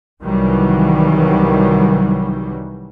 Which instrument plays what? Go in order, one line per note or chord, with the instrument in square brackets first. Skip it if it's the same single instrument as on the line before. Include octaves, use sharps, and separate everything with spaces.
[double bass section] C2 D#3 E3 F#3 G3